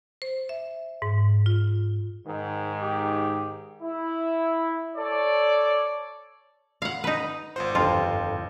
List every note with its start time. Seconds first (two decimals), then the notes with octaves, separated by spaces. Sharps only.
0.22 C5
0.49 E5
1.02 G#2
1.46 F4
2.26 G#2 D#3
2.82 G4
3.82 E4
4.96 A4 C#5 D5
6.82 F5 F#5
7.04 D#4 B4
7.56 G#1 F4 C5 F#5
7.75 G1 F2 F4